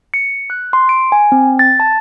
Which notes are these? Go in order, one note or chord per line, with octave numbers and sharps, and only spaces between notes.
C#7
F#6
C6
D7
G#5
C4
A6
A5